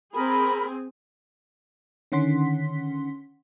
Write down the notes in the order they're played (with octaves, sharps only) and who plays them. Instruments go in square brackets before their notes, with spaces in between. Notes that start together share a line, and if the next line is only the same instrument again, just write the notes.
[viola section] C4 G#4 [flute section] A#4 B5
[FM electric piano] D3 D#3 C#4 F#5 C6 B6